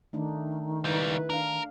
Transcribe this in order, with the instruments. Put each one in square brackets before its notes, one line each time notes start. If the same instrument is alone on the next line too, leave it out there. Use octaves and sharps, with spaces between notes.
[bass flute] D#3 [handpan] A3 D4 D#4
[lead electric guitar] C#2 G3 [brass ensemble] E4 B4
[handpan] D4 F5 [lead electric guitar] A#4